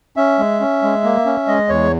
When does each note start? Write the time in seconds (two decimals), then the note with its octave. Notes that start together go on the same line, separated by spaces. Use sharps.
0.16 C#4 E5
0.39 G#3
0.60 C#4
0.83 G#3
1.04 A#3
1.26 C#4
1.47 G#3 D#5
1.69 E2 C#5